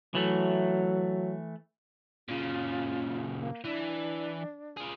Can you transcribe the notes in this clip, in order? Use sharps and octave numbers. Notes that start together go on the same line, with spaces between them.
E3 F#3 A3
A#2 C#3 F4
A#3
E3 D4
F4 G#4